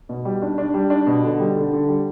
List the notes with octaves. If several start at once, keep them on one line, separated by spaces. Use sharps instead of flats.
B2
G3
D4
D4
G3
D4
B2
D3
G3
D3
D3
G3